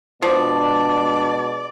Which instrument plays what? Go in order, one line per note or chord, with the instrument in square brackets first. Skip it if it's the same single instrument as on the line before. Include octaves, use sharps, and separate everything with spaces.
[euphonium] B2 [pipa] F3 [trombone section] G#3 D4 [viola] D5